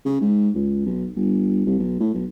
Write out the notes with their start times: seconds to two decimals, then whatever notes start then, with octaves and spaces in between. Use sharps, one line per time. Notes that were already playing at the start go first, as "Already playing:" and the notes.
0.05 C#3
0.21 G#2
0.54 C#2
0.86 B1
1.16 G1
1.66 C2
1.79 B1
2.00 A2
2.14 B1